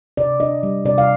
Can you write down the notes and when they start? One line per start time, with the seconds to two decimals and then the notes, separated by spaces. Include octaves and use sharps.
0.17 C3 D5
0.40 D4 D#5
0.63 G3
0.85 C3 D5
0.98 F5